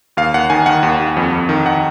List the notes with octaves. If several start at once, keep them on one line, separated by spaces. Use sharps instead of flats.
D#2 F5
D#2 F#5
D#3 G#5
D#3 F#5
D#2
D#2
F2
F2
D#3
D#3 F#5